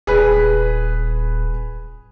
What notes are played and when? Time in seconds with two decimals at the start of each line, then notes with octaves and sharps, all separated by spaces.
0.07 D#1 G#4 B4